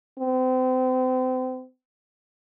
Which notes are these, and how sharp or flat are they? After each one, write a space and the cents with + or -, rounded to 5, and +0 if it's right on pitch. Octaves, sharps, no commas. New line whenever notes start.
C4 -35